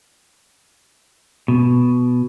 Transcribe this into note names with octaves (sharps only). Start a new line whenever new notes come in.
B2